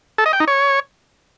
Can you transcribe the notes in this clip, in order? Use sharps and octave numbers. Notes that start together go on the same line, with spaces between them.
A4
D#5
G5
D#4
C#5